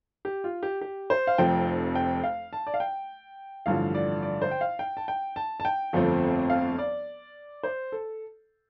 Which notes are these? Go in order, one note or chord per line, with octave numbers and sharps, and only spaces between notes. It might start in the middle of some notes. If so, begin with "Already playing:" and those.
G4
F4
G4
G4
C5
F5
F1 F2 F3 G5
G5
F5
A5
D5
F5
G5
A1 G2 D3 F3 F5
D5
D5
C5
G5
F5
G5
A5
G5
A5
A5
G5
G1 F2 F3 A3 C4
F5
D5
C5
A4